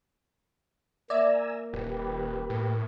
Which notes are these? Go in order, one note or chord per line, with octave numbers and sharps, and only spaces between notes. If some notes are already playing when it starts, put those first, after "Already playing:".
A#3 D5 E5 G#5 A#5 E6
D#1 G4 B4
A2